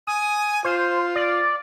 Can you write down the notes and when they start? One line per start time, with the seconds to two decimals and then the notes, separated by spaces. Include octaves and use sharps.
0.07 G#5 D#6
0.64 F4 C5
1.16 D5